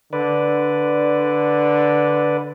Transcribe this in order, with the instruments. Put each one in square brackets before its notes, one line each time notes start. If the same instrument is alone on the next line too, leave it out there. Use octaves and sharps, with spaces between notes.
[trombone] D3 [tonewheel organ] B4 D5